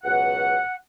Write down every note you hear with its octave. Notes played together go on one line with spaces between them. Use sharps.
C#2 B2 F#3 F#5